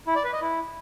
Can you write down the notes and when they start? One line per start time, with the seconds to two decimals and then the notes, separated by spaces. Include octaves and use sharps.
0.07 E4
0.16 D5
0.24 B4
0.33 D#5
0.41 E4